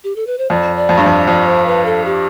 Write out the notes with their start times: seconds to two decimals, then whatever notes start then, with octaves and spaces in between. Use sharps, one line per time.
0.04 G4
0.16 A4
0.27 B4
0.38 C5
0.50 F2 D5
0.76 D5
0.89 F2
0.97 G2
1.02 F2 D5
1.27 F2 D5
1.47 C5
1.66 B4
1.85 A4
2.05 G4